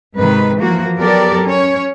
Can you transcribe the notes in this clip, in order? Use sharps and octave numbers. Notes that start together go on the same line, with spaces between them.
G#2 C3 D#3 B4
E3 F3 A#3 F#4
F#3 B3 G4 A4 A#4 D5
C#4 C#5